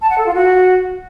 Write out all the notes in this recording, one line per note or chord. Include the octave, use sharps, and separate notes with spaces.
A5
F#5
A4
F4
F#4